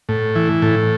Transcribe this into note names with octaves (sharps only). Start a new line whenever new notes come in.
A2
E3
A2